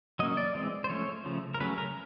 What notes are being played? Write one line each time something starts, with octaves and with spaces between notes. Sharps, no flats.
F#3 A#3 C#4 D#5
D5
E3 G#3 C4
C5
F3 A3 C#4 C#5
C#3 F3 A3
A#4
C#3 F#3 A3 C#4 B4
A#4